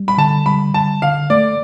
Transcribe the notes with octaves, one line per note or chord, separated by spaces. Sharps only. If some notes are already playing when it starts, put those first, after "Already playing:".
Already playing: G3
B5
D3 A5
G3 B5
D3 A5
D3 F5
A3 D5